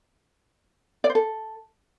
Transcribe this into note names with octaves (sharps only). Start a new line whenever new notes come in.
D5
C5
A4